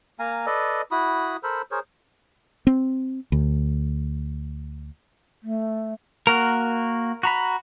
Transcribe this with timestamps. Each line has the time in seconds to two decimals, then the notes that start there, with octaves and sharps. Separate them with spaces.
0.19 A#3 F5 G#5 A#5
0.46 A4 B4 D5 D#5
0.91 E4 F#4 B5 D#6
1.43 A4 A#4 C5 B5
1.71 G#4 A#4 C5 C#5
2.67 C4
3.32 D2
5.43 A3
6.27 A#3 F#4 A#4
7.23 F#4 A#5 B5